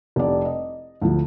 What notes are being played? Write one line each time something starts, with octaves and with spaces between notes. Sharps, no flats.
F1 C2 D5
D#5
D2 F3